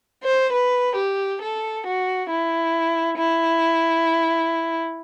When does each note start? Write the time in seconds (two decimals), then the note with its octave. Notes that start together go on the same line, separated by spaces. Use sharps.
0.23 C5
0.53 B4
0.96 G4
1.41 A4
1.85 F#4
2.29 E4
3.18 E4